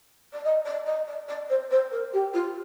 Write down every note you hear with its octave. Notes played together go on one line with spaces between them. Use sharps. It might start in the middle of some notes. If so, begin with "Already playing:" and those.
D5
D#5
D5
D#5
D5
D5
C5
C5
A#4
G4
F4